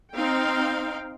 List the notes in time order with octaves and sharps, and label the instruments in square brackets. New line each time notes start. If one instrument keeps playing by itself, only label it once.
[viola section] C4 D#4 F5 G5